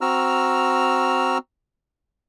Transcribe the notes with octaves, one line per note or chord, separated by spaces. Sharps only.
C4 F#4 A#5 E6 F6